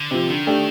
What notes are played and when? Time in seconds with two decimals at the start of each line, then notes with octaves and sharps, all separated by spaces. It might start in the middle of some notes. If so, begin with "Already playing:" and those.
Already playing: D3
0.11 C3 F3
0.29 D3 D#3
0.47 A3 D4 G4